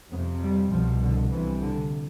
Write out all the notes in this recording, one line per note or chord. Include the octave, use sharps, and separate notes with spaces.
F2 C3 B3
G3
C2 B2 F3
D3
C2 C3 E3
D3